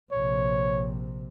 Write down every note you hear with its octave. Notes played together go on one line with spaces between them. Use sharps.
A#1 C3 C#5